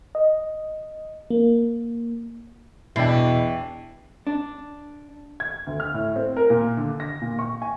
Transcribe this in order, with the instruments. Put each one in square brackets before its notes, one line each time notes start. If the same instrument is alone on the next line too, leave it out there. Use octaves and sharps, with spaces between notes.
[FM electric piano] D#5
A#3
[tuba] E2 [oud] B2 [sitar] E3 D4 [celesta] G5 C7
[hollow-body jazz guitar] D4
[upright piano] G#6
D2
F6
A2
C4
A#4
A#2
D3
A#6
A#2
C#6
G#5